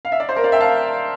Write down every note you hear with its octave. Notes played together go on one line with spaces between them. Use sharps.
F5
E5
D5
C5
A#4
D5 F5
E5 G5
F5 A5